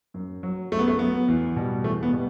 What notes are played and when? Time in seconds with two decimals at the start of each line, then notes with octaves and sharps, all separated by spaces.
0.14 F#2
0.43 F#3
0.72 F#2 A3
0.79 B3
0.88 A3
0.99 F#3 B3
1.28 E2
1.56 B2 G3
1.84 E2 A3
2.03 B3
2.13 B2 G3